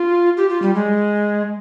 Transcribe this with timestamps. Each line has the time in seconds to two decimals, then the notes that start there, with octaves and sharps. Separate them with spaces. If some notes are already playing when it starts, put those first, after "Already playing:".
Already playing: F4
0.37 G4
0.49 F4
0.62 G3
0.75 G#3